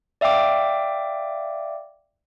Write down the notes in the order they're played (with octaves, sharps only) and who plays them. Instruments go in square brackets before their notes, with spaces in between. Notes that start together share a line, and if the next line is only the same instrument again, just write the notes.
[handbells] D5 E5 F5 G5 D6